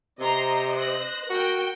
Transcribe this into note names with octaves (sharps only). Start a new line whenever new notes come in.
C3 C5 D#5 A#5 C6
F#6 A#6
F#4 A#4 G5